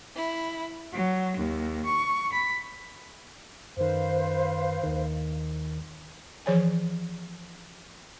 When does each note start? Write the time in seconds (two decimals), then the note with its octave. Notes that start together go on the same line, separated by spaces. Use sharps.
0.16 E4
0.90 F#3
1.36 D#2
1.84 C#6
2.31 B5
3.77 F#2 D#3 B4 C5 F5
4.83 D#2 D#3
6.46 E3 F3 G#4 C#5 D5 G#5